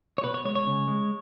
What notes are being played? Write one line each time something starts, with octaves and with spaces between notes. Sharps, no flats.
C#5
B2 B4
C#5
G#3 C#5
C#5
C#3
G#3